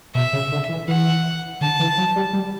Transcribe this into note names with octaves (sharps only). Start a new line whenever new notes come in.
B2 E5
C#3
D3
E3
E3 F#5
D3 A5
E3
F#3
G3
G3